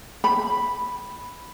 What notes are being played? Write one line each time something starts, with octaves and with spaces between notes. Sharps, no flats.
B5